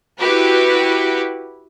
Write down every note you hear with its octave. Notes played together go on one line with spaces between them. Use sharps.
E4 F#4 G4 B4